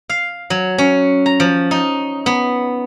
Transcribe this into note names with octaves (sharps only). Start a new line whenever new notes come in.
F5
F#3
C#4
A#5
F3
D#4
B3